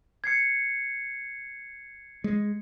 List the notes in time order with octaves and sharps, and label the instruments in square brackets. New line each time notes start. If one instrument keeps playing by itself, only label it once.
[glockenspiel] G#6 C7 C#7
[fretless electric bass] G#3